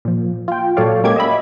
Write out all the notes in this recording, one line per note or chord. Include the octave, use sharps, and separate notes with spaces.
A#2 F3
F4 G5
A#2 F#3 A4 C#5 D5 F5
G#3 A#3 C#4 G4 D6 G#6
D#5 E5 B5